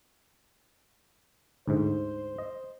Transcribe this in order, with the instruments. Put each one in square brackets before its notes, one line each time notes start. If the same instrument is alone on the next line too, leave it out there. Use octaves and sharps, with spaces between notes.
[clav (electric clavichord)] D2 G#2 [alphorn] C5
[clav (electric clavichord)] D#5